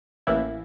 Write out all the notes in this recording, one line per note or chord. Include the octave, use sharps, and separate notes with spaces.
A1 A2 E3 A#3 E4